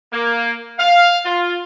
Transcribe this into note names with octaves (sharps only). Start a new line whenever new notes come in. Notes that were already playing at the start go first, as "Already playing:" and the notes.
A#3
F5
F4